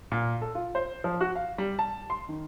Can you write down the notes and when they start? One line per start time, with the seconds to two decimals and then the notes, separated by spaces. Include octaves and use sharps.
0.12 A#2
0.42 A4
0.55 F4
0.75 C5
1.04 F3
1.21 F#4
1.36 F5
1.58 G3
1.79 A5
2.10 C6
2.29 D#3